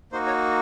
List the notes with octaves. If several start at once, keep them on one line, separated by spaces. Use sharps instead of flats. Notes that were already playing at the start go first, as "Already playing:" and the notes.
A#3 D#4 F#4 C5
C#5